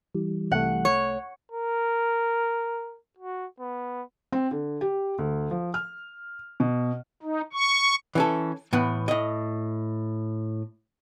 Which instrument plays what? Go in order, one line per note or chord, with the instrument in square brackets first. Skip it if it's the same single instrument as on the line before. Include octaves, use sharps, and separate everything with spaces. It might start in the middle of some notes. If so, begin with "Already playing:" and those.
[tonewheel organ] E3 G3
[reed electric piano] C2 A3 [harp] F#5
[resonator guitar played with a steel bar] C#5
[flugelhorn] A#4
F#4
B3
[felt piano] C4
D3
G4
D2
F3
F6
B2
[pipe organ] D#4
C#6
[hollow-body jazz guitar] E3 C#4 A4
A2 E3 B3
A2 D#5